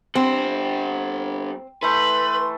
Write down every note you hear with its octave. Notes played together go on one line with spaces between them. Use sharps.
D3 G3 C4
E3 A3 B4 C6